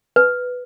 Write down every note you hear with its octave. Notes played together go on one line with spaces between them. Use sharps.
B4